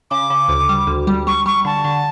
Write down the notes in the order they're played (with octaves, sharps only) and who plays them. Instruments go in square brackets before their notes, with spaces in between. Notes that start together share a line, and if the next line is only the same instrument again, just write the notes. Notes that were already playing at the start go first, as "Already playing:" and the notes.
[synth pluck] C#3 [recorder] D6
[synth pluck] C#3
D2
G3
D2
G3
[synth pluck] G3 [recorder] C#6
[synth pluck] G3 [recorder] C#6
[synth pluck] D3 [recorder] A5
[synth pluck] D3